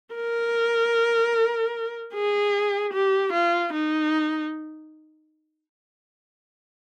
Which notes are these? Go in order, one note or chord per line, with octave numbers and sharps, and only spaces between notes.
A#4
G#4
G4
F4
D#4